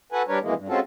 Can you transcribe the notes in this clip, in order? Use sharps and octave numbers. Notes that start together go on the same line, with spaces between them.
F#4 A4 B4 F#5 G#5
G3 D4 A#4 B4 C#5
F2 B2 E3 G#3 A#3
G2
G#3 C4 C#4 F4 F#4 A4